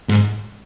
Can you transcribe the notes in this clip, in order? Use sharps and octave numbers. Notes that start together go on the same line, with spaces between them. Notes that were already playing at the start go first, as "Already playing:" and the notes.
G#2